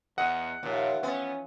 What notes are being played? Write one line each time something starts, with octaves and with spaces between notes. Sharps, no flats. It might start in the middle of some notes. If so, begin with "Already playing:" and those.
E2 D#5 F#5
D#2 A#2 E3 F3 F4
B3 C#4